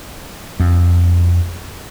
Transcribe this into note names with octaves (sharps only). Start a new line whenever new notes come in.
F2